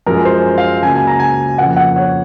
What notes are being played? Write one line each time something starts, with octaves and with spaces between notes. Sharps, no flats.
F#2 F3 G#3 A#4
C5
F5
C#2 C#3 F#3 A#3 G#5
G#5
A#5
G#5
F2 C#3 F3 A#3 F#5
F#5
C#5